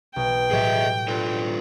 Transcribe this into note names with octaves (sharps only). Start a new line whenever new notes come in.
B1 G5
A2 F#3 G3 G#4 D#5 E5
F4 A4 B4